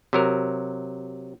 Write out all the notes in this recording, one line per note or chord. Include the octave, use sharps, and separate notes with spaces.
C3 F#3 A#4